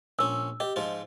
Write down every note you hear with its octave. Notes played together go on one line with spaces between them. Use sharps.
A#1 C#4 E6
G4 D#5
G#2 F3 F4